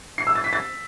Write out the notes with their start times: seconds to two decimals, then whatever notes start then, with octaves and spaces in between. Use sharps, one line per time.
0.18 C7
0.27 E6
0.35 A6
0.44 B6
0.53 A6